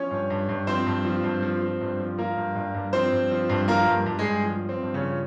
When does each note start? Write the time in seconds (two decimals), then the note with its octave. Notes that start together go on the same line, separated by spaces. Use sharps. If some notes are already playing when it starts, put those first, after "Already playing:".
Already playing: F3 C#4 C#5
0.11 G2
0.30 G2
0.49 G2
0.67 F3 C4 C5
0.86 G2
1.05 F3
1.24 G2
1.42 F3
1.62 F3
1.81 G2
2.00 F3
2.18 F3 A#3 A#4
2.37 G2
2.55 G2
2.74 G2
2.93 F3 C4 C5
3.12 G2
3.31 F3
3.49 G2
3.68 F3 A#3 A#4
3.87 G2
4.06 G2
4.19 G#3 G#4
4.25 G2
4.43 F3
4.63 F3
4.69 C4
4.82 G2
4.94 C#3 C#4
5.01 F3